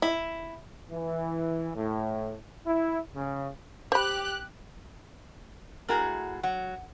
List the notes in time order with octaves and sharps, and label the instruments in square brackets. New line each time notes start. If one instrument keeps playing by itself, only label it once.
[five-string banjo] E4
[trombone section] E3
A2
E4
C#3
[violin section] G4 F#6 [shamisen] C5 B5
[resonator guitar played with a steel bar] A2 F#4 G#4 [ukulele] A#4 E5 A#5
[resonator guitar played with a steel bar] F#3 [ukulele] F#5